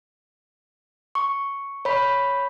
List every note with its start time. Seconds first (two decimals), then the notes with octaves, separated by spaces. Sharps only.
1.15 C#6
1.85 C#5 B5